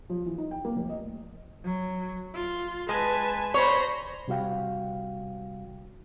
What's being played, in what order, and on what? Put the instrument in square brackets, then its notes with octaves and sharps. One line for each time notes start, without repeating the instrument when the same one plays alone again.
[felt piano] F3
E3
D#4
G5
A#3
F1
D#5
[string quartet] F#3
F4
[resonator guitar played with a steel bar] G#3 [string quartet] B4 G#5 A5
[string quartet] C5 A#5 B5 [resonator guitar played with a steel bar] C#5
[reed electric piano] C3 G3 F#4 F5 G5